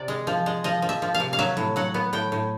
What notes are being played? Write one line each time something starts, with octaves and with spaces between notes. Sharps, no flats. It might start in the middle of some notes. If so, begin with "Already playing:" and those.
Already playing: C3 D5
G#3
F3
G#3
F3 D#5
F3
E5
F3
F5
C3
F5
F#3 E5
A2
F#3 F#5
B3
A2 G5
A2